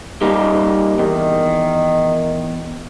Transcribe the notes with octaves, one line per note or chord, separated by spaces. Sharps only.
G3 A#3 D#4
E2 D#3